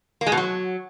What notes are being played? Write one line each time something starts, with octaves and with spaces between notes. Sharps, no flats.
A#3
G#3
B2
F#3